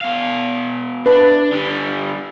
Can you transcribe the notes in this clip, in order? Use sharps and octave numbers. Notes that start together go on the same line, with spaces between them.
B2 F5
D4 B4 A5
D3 G3